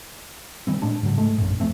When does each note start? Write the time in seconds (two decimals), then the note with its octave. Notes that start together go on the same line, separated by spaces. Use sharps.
0.67 D#3 G3 C4
0.82 A2 G#3 D4
1.03 G#2 C#3 F#3
1.18 G#2 G#3 A3
1.38 A#1 F#2 A2
1.60 E1 F3 A3 C4